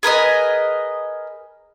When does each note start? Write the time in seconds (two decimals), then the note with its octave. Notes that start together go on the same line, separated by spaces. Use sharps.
0.03 G#4 A#4 B4 D#5